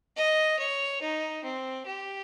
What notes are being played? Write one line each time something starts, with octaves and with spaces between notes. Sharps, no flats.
D#5
C#5
D#4
C4
G4